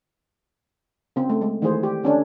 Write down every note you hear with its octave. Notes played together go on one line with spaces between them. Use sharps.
C#3 C4
A3
G#3
D#3 E3 A3 E4 G#4 C5
G4
D3 C#4 D4 A4